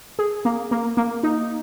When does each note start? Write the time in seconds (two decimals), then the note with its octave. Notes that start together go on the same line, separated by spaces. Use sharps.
0.19 G#4
0.45 A#3
0.71 A#3
0.97 A#3
1.23 D#4